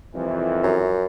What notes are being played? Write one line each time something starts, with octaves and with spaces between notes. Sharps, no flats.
C2 F2 E3
F#2